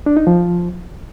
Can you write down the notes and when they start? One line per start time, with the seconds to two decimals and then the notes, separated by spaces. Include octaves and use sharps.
0.06 D4
0.17 D#4
0.27 F3